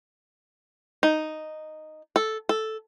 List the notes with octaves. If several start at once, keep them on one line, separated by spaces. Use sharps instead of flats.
D#4
A4
A4